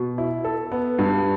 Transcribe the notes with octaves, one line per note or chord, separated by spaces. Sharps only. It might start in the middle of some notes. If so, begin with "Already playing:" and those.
Already playing: B2
E4
A4
B3
G2